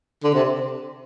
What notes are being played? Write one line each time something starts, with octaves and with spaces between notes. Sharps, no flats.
D3
C3